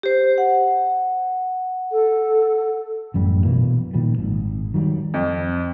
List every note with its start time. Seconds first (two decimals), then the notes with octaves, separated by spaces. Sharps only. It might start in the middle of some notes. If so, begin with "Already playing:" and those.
0.03 G4 C5
0.38 F#5
1.92 A4
3.14 A1 F#2 G3
3.44 A#1 B2 E3 A#3
3.94 A#2 D#3 F3 G3
4.19 G#1
4.74 D#3 F#3 G3
5.14 F2